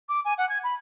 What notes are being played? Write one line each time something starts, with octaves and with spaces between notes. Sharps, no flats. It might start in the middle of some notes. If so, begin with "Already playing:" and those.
D6
G#5
F#5
G#6
B5